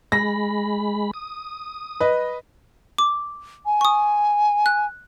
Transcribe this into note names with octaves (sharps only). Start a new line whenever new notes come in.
G#3 B5 A#6
D#6
B4 D#5
D6
G#5
C#6 D#6
F#6